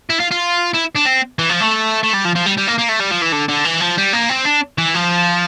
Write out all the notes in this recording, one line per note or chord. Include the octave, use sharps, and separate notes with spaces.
E4
F4
F4
E4
D4
C4
E3
F3
A3
A3
G3
F3
F3
G3
G3
A#3
A#3
A3
G3
F3
E3
D3
D3
E3
F3
G3
A#3
C4
D4
E3
F3